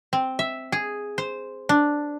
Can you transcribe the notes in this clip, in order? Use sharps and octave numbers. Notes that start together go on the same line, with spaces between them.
C4
E5
G#4
C5
D4